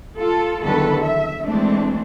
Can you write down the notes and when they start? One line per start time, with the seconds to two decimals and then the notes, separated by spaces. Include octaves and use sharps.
0.17 F4 A4
0.64 E2 D3 D#3 F#3 A4 B4
1.02 E5
1.44 E3 G#3 A3 C4 D4